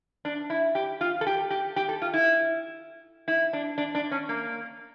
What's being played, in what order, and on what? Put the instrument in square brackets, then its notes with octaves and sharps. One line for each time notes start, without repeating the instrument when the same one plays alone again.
[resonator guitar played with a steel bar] D4
E4
G4
F4
A4
G4
G4
G4
A4
F4
E4
E4
D4
D4
D4
C#4
A#3